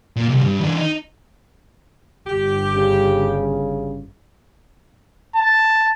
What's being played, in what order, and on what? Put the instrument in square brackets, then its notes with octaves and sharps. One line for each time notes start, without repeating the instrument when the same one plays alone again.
[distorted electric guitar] A#2
C2
G2
E3 D4
D#4
[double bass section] G1 [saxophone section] G4
[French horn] C#3
[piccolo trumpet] A5